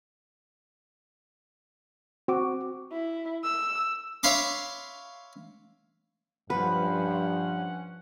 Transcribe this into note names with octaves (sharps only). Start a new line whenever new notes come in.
C4 F#4 D6
E4
E6
C#5 E5 F5 B5 C6 D6
G2 F3 C#4 B4 F#5